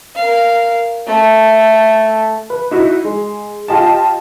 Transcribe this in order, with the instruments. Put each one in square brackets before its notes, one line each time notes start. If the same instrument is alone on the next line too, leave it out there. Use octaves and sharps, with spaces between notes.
[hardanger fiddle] A#4 F5
A3
[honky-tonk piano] B4
D#4 E4 F#4
G#3
F4 G4 D#5 A5